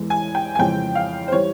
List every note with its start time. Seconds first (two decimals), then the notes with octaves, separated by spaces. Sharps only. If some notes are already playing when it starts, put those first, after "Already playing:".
Already playing: E2 E3 G#3
0.10 G#5
0.35 G5
0.55 G#5
0.59 F2 C#3 E3 G#3 G5
0.95 F5
1.28 C5
1.32 E3 G3 C#5